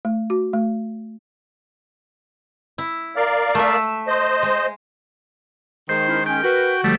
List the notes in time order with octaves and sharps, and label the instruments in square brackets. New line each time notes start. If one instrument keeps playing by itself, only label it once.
[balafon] A3
F#4
A3
[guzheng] E4
[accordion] A#4 D5 F5
[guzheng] A3 E5
[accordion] C5 D#5
[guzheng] G#3
[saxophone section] D#3 G#3 [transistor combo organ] C5
[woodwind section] C#4 E4 A#4
[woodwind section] C#4 [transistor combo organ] G5
[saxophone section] F#4 [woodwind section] A#4 B4
[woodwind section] D3 F3 [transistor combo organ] G3 A3